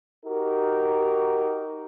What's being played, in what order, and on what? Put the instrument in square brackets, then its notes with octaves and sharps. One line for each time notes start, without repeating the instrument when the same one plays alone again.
[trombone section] D#4 F#4 G4 A#4